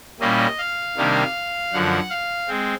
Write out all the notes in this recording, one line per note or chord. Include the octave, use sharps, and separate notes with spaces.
A#2 G3 A#3 C#4 E4 D#5
F5
C3 D#3 G3 A#3 D4
F#2 D3 F3 F#5
F5
G#3 C4